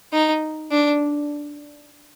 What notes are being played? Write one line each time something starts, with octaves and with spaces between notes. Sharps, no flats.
D#4
D4